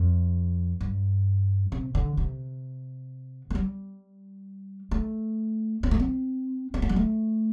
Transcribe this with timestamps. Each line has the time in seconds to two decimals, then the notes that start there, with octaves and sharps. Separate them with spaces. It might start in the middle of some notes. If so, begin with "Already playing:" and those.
Already playing: F2
0.81 G2
1.72 C3
1.95 D3
2.17 C3
3.50 A3
3.55 G3
4.91 A3
5.83 C4
5.91 A3
6.00 C4
6.74 C4
6.82 A3
6.89 G3
6.96 A3